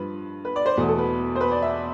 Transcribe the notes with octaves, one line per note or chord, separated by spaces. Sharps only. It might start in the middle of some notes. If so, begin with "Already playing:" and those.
Already playing: G2 F3 B4
B4
D5
C5
E2 B2 A3
A4
B4
C5
B4
D5
E5